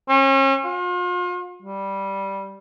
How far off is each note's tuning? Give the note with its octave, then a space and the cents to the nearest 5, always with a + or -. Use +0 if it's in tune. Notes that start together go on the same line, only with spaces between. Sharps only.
C#4 -40
F4 +40
G3 -5